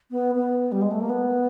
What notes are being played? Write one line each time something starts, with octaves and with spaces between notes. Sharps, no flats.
B3
B3
G3
G#3
A3
A#3
B3